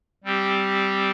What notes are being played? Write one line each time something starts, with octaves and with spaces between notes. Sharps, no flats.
G3 C4 G4